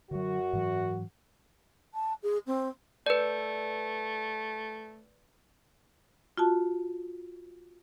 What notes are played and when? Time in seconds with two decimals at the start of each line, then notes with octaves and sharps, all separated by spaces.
0.11 F#2 D3 F#3 F#4
0.53 G#2 E3 F#3
1.94 A5
2.23 G#4
2.47 C4
3.06 A3 B4 D5
6.38 F4 F#4 A5